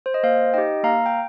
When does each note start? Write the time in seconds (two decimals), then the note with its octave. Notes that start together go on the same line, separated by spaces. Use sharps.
0.06 C5
0.14 D#5
0.23 A#3 C5 F5
0.54 D#4 G4 D#5 G5
0.84 A#3 F5 A#5
1.06 G5